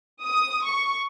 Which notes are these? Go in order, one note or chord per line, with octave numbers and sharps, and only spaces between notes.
D#6
C#6